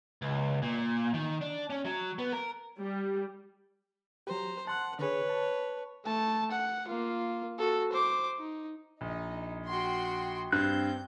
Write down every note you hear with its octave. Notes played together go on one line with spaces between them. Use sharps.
C#2
A#2
D#3
D4
C#4
F#3
B3
A#4
G3
F#3 G4 C5 A#5
F#5 A5 C6 F#6
D3 G#4 B4 C#5
A5
A3 A5
F#5
A#3 F4
F#4 A4
C5 D6
D#4
A#1 D#4
F#4 G5 C6
G2 C4 F#6 G6